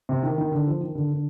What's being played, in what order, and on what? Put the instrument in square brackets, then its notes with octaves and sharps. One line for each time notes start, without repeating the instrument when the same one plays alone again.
[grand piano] C3
D#3
D#3
D3
F3
D#3
D3
D3